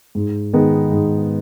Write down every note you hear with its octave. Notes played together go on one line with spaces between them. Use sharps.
G#2
D#3 G#3 B3 D#4
G#2